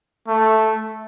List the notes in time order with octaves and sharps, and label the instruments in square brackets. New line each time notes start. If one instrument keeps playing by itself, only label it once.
[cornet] A3